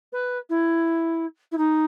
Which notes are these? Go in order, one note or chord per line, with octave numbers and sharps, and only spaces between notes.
B4
E4
E4
D#4